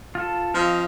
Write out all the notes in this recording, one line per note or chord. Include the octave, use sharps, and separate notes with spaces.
F4 A4
F3 C4 D#5 F5